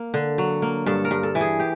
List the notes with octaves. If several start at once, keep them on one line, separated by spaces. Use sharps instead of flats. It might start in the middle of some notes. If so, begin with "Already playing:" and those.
Already playing: A#3
D3
F#3
A#3
G2 A4
A#4
G2
A4
E3
G#4
G4